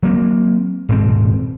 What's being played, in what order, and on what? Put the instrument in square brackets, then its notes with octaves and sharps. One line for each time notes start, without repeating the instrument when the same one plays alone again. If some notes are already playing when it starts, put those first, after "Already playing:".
[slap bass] F#3 A#3 C4
D#1 G#2 B2 C4